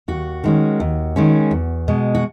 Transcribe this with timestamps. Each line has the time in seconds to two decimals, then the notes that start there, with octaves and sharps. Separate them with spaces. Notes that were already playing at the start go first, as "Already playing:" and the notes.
0.08 D#2 F#4
0.44 D#3 G#3 C#4
0.80 D#2
1.16 D#3 G#3 C#4
1.51 E2
1.88 B2 G#3
2.15 F#4